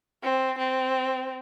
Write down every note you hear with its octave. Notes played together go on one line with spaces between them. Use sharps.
C4
C4